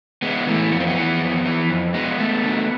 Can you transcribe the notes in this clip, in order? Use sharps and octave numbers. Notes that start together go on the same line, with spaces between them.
G#3 B3
E3 A3
F2 B3
C4
B3
E3
F2
E3
F2
G#3 B3
A3
D3